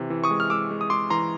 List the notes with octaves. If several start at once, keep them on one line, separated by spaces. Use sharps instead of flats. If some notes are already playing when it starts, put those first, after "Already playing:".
Already playing: C3 E3
E3
C#6 D#6
G#3
F6
G#3 D6 E6
G#3
D#6
G#3 C6 D6
E3 A#5 C6